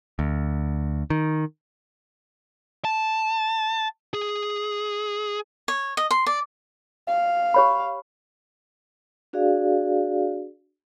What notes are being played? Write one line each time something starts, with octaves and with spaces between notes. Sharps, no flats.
D2
D#3
A5
G#4
C#5
D#5
C6
D5
F5
G4 C#5 B5
D4 F#4 G#4 D5 F5